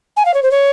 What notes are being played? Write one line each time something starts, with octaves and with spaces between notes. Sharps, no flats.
G#5
F5
C#5
C5
C#5